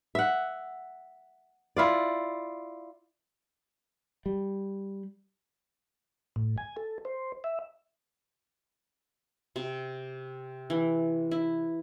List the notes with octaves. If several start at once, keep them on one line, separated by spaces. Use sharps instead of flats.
E5 F#5
E4 F4 D5
G3
A2
G#5
A4
C5
E5
C3
E3
E4